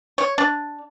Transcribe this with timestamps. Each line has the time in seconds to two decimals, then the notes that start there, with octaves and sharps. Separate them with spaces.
0.18 C#5
0.38 D4